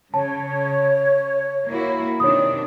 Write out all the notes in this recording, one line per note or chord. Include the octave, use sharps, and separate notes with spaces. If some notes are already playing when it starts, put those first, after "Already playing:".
C#3 C#5 A5
A#3 E4 F#4
C3 D#3 D4 C#5 D#6